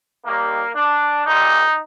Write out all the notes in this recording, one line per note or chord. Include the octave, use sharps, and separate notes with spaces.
D#2 D#3 G3 A#3
D4
A#1 A#2 G3 D#4